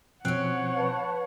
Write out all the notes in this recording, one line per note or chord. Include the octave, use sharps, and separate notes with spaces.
B2 F3 C4 C#4 C#5 F#5 F#6
B4 A5